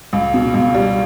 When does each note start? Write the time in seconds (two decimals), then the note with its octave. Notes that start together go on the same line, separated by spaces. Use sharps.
0.13 C#2
0.34 B2
0.54 C#2
0.75 G3